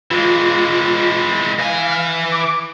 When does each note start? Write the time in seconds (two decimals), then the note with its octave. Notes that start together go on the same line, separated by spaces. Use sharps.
0.11 E3 G#3 F4
1.59 E3 F5 G#5
2.32 D6